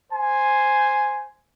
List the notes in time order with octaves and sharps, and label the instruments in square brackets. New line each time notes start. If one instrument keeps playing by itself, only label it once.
[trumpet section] C5 G#5